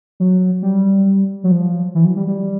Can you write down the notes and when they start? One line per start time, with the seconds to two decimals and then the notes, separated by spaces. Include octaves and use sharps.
0.20 F#3
0.62 G3
1.44 F#3
1.51 F3
1.95 E3
2.05 F#3
2.16 G3
2.28 G3